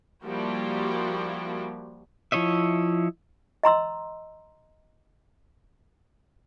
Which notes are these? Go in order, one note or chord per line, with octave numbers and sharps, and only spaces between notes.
F3 G3 A#3 E4 F#4 G4
F3 E4 C#5 D#5 E5
D#5 A#5 C6 E6